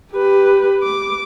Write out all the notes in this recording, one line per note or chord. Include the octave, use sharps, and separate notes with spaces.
G4 B4
D6